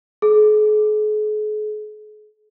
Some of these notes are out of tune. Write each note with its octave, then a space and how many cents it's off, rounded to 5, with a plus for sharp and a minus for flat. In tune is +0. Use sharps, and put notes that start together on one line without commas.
G#4 +45